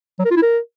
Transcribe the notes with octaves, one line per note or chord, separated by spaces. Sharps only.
F#3
A#4
F4
E4
A#4